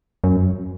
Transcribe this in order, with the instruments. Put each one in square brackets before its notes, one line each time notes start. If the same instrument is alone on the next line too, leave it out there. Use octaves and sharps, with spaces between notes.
[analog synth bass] F#2